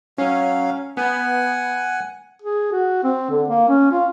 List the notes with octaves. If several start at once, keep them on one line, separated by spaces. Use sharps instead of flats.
F#3 C#4 F5
B3 F#5 G#5
G#4
F#4
C4
D3
A#3
C#4
F4